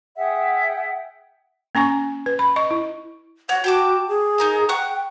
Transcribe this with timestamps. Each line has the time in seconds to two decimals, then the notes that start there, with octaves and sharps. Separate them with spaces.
0.16 G#4 E5 F#5 G5
1.75 A#3 C#4 G#5 C#6
2.26 B4
2.39 B5
2.56 D#5 C#6
2.71 E4
3.49 C#5 F#5
3.64 F#4 G5 A5 D6
4.08 G#4
4.38 D#4 A#4 F5
4.69 F#5 G5 C#6 F#6